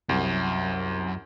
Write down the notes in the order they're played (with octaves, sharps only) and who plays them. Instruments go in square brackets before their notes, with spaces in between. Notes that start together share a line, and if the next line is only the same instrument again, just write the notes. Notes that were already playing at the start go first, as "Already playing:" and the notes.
[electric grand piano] C2 [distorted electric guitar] F#2